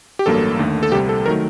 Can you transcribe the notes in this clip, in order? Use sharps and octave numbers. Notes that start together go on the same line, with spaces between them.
G4
A1 G2 F#3 A#3 A4
D#2 D3 A3
A4
C2 C3 G3 G4
A4
D#3 F#3 A3 A#4